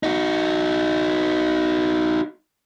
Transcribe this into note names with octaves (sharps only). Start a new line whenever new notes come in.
D#4 F#4